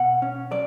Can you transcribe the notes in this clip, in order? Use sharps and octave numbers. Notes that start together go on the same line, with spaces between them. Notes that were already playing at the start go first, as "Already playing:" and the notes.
Already playing: B2 F#5
C#4
F#3 D5